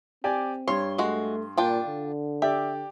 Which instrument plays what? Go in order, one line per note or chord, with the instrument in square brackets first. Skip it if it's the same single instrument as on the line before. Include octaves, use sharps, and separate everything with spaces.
[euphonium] C4 [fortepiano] G4 D5 G#5
[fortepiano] G2 C6 [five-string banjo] C#5
[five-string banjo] G#3 F#4 [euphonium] A3
[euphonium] A#2 [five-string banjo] D4 F4 G5
[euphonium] D3
[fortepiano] G4 D5 [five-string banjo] E5